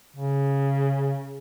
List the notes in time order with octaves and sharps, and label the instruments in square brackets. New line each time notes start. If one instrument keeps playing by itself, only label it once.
[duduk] C#3